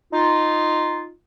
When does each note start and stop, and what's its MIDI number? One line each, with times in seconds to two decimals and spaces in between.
0.13 1.10 63
0.13 1.10 65